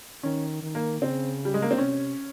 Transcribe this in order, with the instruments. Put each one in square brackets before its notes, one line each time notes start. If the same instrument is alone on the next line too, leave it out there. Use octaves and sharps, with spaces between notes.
[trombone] D#3 [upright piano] C#4
[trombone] D#3
[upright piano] A#3
[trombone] C#3 [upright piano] C4
[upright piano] G3
G#3
A#3
C4
[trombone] C3 [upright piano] C#4